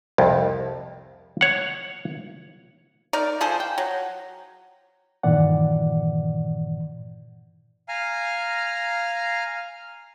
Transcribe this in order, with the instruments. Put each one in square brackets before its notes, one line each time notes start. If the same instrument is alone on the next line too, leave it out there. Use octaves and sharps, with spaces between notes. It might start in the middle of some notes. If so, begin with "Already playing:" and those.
[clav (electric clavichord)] C2 F2
C#5 F#5
[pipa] D#4 A#4 D5
F3 G#4 A4 C5
G5
F#3
[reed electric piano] G2 A#2 D#3 E3 D5 F#5
[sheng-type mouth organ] F5 G#5 A#5 F6